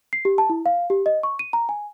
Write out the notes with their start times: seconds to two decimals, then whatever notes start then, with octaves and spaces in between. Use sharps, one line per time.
0.13 C7
0.25 G4
0.38 A5
0.50 E4
0.66 F5
0.90 G4
1.06 D#5
1.23 C#6
1.39 D#7
1.53 A#5
1.69 G#5